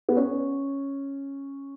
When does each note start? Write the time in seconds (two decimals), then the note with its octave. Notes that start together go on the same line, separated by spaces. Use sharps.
0.09 B3
0.17 C#4